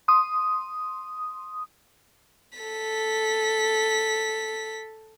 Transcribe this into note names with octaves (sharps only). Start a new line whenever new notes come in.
C6 D#6
A4 B6